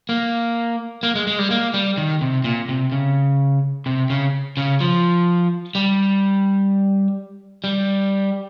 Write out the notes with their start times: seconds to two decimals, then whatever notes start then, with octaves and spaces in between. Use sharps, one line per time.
0.09 A#3
1.03 A#3
1.15 G#3
1.27 G#3
1.39 G3
1.51 A#3
1.74 G3
1.98 D#3
2.21 C3
2.44 A#2
2.69 C3
2.92 C#3
3.86 C3
4.10 C#3
4.57 C#3
4.81 F3
5.75 G3
7.64 G3